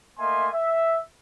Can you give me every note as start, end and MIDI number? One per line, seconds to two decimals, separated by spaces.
0.19 0.48 57
0.19 0.48 58
0.19 0.48 75
0.19 0.48 76
0.19 0.48 80
0.19 0.48 84
0.54 0.99 76